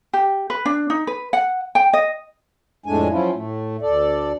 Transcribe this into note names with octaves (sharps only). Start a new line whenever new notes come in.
G4
B4
D4
D#4
B4
F#5
G5
D#5
F2 A2 G#3 A3 D4 G#5
F3 F#3 C#4 E4 F4
A2 A3
D2 A4 D5